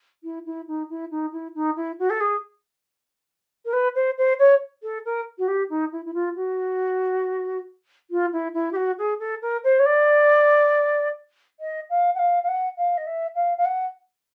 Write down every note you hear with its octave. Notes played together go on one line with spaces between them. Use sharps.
E4
E4
D#4
E4
D#4
E4
D#4
E4
F#4
A4
G#4
A#4
B4
C5
C5
C#5
A4
A#4
F#4
G4
D#4
E4
E4
F4
F#4
F4
E4
E4
G4
F#4
G#4
A4
A#4
C5
C#5
D5
D#5
F5
F#5
F5
F5
F#5
F5
D#5
E5
F5
F5
F#5